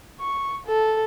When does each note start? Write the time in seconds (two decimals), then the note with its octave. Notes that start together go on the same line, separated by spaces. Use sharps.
0.20 C#6
0.67 A4